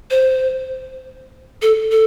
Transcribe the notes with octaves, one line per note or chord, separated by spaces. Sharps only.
C5
A4
A4